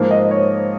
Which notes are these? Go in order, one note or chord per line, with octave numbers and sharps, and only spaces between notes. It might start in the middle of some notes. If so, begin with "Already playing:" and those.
Already playing: G#2 F3 A#3
D#5
C#5